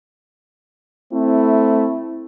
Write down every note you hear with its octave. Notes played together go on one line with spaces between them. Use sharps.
A3 C4 E4